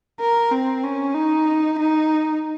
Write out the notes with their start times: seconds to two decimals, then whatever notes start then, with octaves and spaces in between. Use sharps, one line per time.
0.20 A#4
0.51 C4
0.83 C#4
1.15 D#4
1.78 D#4